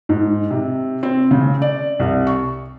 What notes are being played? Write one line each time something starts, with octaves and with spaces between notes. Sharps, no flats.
G#2
C3
C4
C#3
D5
C2
C#6